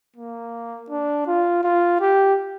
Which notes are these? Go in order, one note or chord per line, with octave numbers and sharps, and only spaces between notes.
A#3
D4
F4
F4
G4